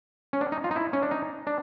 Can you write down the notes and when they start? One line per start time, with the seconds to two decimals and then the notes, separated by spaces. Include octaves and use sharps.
0.33 C#4
0.41 D4
0.52 D#4
0.64 F4
0.71 D#4
0.76 E4
0.93 C#4
1.03 D4
1.11 D#4
1.47 D4